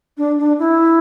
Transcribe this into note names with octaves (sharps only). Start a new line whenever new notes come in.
D4
D4
E4